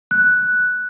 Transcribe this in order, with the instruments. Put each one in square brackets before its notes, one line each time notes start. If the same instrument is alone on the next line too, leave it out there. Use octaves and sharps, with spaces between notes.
[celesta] F#6